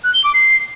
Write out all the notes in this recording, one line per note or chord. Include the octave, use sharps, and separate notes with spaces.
F#6
G7
D6
C7